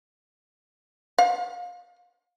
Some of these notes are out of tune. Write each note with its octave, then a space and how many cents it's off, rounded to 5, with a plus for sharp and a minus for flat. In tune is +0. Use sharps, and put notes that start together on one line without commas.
F5 +25